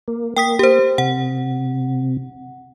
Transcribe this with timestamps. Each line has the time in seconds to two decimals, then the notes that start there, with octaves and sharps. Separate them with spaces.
0.08 A#3
0.37 A#3 G5 D#6 B6
0.59 G4 C5
0.98 C3 F#5